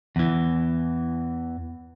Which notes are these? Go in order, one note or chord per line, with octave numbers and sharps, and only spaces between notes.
E2 E3